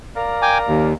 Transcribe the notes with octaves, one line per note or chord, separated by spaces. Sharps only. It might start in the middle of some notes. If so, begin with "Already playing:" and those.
A#4 D5 F5
G5 G#5 D6
D#2